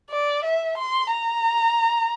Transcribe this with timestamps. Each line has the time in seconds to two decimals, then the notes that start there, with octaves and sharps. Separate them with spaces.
0.10 D5
0.44 E5
0.78 C6
1.12 A#5